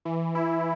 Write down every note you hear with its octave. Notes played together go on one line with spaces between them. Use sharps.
E3
E4